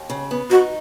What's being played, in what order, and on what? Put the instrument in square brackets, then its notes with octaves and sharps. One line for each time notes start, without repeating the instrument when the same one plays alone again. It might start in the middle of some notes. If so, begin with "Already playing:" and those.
Already playing: [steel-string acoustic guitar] D#2
C#3
B3
[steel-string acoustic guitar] D#4 [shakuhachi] F#4